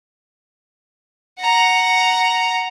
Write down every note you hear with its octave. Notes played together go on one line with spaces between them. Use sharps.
F#5 A#5